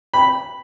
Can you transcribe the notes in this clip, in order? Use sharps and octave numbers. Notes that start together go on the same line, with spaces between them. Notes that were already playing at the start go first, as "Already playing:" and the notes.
B5